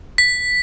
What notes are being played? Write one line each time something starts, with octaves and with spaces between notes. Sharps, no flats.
B6